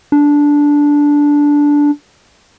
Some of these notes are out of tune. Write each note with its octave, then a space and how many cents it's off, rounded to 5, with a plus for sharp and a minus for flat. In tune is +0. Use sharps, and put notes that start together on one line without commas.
D4 -10